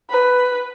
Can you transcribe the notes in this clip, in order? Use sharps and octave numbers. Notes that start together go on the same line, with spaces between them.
B4